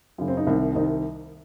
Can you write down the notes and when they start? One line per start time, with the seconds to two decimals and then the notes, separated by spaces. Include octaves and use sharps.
0.18 F#2 C#3
0.28 C4
0.37 D#4
0.47 C2 C3 D#3
0.75 C2 C3 D#3 D#4